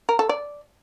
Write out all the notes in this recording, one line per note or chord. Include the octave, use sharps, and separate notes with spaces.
A#4
A4
D5